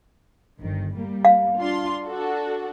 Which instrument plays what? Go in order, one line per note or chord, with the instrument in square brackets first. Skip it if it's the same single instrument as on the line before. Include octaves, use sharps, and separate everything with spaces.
[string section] G1 D#3
G3 A#3
[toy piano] F5
[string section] D4 F4 C6
D4 F#4 A4